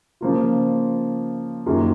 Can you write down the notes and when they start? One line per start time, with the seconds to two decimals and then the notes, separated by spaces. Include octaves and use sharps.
0.21 C#3 F3 A#3 F4
1.66 F#2 D#3 A#3 F4 G#4